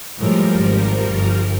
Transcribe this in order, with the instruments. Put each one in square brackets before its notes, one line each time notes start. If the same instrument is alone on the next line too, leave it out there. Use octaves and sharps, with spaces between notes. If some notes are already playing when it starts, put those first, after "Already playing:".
[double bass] A2 G#3 [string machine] F3 G3 A#4
[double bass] G#1
G1